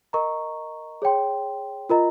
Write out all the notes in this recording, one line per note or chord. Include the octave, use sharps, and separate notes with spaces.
A#4 D#5 A#5 C#6
G#4 C#5 G5 C6
F4 A#4 D#5 A#5